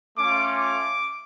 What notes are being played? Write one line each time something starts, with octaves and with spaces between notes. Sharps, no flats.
A3 C#4 F4 D6
D6